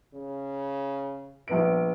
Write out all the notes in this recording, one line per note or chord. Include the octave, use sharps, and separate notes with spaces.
C#3
A#1 G2 B3 D7